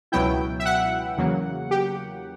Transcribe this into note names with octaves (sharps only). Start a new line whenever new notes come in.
C#2 B2 F#3 B3 E4 G5
E5
F#5
E2 C#3 F#3 A#3
G4